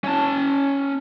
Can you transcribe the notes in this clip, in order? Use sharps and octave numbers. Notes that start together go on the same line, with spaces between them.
C#4 A5